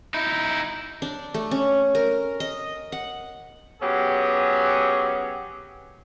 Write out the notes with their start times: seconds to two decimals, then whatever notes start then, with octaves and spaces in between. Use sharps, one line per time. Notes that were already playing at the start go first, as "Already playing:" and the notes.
0.14 D#4 E4
1.02 D4
1.34 A3
1.51 C#4
1.95 A#4
2.40 D#5
2.92 F#5
3.81 F#3 B3 C#4 G4 G#4